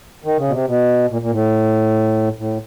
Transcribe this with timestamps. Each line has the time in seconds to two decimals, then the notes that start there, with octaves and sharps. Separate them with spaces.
0.25 D#3
0.39 C#3
0.48 B2
0.53 C3
0.68 B2
1.11 A#2
1.22 A#2
1.32 A2
2.39 A2